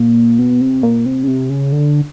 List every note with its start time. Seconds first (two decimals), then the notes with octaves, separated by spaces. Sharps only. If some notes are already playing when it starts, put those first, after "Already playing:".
Already playing: A#2
0.39 B2
0.61 C3
0.83 A#2
1.06 C3
1.23 C#3
1.27 C3
1.50 C#3
1.72 D3